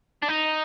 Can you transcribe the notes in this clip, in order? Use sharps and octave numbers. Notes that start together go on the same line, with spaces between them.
D4
D#4